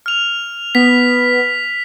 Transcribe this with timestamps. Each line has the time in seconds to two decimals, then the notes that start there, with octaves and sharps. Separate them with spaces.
0.06 F6 F7
0.75 B3 B6